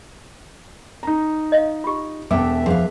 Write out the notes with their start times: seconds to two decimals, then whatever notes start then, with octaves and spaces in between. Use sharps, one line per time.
1.03 D#4 A#5
1.52 D#5 F5
1.84 F4 G4
2.31 E1 A3 B3 E5 G5 D6
2.66 F3 G#4 B4 F5 F#5